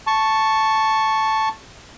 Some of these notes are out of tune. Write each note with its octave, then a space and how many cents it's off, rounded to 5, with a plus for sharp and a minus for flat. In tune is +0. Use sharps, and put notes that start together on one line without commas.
A5 +0 C#6 +0